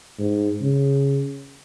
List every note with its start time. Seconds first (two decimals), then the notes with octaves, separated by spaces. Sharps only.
0.18 G#2
0.61 C#3